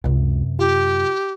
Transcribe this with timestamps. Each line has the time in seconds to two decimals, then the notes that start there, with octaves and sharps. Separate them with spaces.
0.04 C#2 F#2 C3
0.59 F4 G4